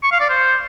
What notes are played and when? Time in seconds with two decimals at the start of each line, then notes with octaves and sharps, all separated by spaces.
0.03 C#6
0.12 F5
0.21 D5
0.29 C5